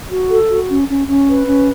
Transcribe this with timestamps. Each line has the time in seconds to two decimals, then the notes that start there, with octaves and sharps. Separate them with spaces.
0.11 F#4
0.30 A4
0.49 F#4
0.69 C#4
0.88 C#4
1.08 C#4
1.27 B4
1.46 C#4